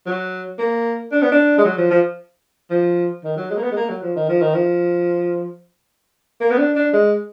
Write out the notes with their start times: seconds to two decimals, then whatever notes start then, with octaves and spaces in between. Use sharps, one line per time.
0.06 F#3
0.59 A#3
1.12 D4
1.22 B3
1.32 D4
1.58 G#3
1.65 F#3
1.78 F3
1.91 F3
2.70 F3
3.24 D#3
3.37 F#3
3.50 G#3
3.58 A#3
3.63 B3
3.71 G#3
3.76 A#3
3.89 F#3
4.03 F3
4.16 D#3
4.29 F3
4.42 D#3
4.54 F3
6.41 A#3
6.51 B3
6.58 D4
6.76 D4
6.93 G#3